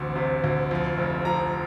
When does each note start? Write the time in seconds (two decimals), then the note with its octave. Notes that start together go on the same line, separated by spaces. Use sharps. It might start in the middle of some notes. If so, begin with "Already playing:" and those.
Already playing: A1 D2 C3
0.16 C3
0.44 D2
0.71 F2
0.98 F1
1.25 F3 A#5